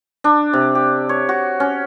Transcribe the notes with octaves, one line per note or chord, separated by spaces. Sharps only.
D4
C3
G4
C#5
F#4
C#4